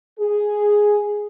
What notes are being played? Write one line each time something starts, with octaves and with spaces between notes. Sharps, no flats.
G#4